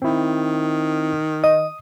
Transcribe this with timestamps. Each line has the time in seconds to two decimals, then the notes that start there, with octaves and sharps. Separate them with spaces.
0.02 D#3 C4 E4
1.44 D#5 D#6